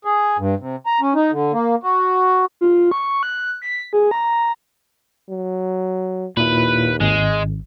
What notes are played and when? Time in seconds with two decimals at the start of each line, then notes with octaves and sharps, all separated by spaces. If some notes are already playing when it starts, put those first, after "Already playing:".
0.05 G#4
0.39 G2
0.60 C3
0.86 A#5
1.01 C#4
1.15 D#4
1.32 D3
1.53 A#3
1.83 F#4
2.61 F4
2.91 C#6
3.23 F#6
3.62 B6
3.93 G#4
4.11 A#5
5.29 F#3
6.37 D#2 A#2 E4 B4
7.01 G#1 G#3